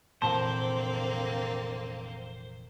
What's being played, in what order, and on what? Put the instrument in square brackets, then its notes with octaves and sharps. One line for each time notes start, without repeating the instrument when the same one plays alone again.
[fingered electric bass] F1 A#2 E3 [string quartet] D3 A#3 C4 [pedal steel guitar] C5 [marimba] A5